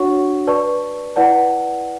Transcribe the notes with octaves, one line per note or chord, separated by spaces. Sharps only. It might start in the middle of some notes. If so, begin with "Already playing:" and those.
Already playing: D4 F#4 C#5 F#5 C#6
B4 D5 A5 C#6
E4 B4 D5 F#5 A5